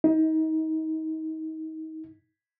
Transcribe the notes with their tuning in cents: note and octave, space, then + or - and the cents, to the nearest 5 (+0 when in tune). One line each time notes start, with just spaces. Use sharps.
D#4 +30